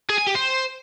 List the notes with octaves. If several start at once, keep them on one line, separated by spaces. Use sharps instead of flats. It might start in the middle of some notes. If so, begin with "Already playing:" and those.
G#4
G#5
G4
C5